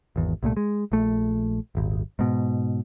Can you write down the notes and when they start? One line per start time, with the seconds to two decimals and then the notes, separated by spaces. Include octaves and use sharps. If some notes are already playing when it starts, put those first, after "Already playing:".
0.16 G#1 E2
0.43 C2 A#2 A3
0.57 G#3
0.92 A#1 A3
1.75 D#1 G#1
2.19 G#2 B2